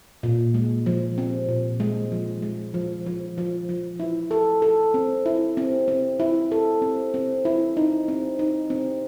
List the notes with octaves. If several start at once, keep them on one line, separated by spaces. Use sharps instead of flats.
A#2
G#3
F3
C4
A#2
G#3
F3
G#3
F3
F3
F3
F3
E4
A4
A4
C4
E4
C4
C4
E4
A4
C4
C4
E4
D#4
C4
D#4
C4